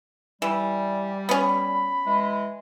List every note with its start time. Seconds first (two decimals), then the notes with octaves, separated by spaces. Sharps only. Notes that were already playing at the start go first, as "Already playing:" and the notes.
0.42 E3 G3
1.29 B3 C#4 B5
2.06 E3 G#3